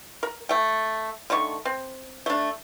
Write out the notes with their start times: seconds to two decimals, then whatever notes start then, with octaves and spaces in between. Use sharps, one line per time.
0.23 A#4
0.49 A3 G5
1.30 D3 D#3 A3 C#6
1.65 C4
2.26 A3 D4